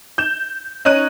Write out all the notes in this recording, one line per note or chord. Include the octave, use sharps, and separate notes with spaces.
G6 E7
C#4 D#4 C#5 F#6 D#7